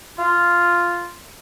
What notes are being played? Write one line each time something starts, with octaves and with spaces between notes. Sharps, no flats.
F4